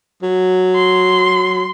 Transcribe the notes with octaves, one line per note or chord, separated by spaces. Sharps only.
F#3
C6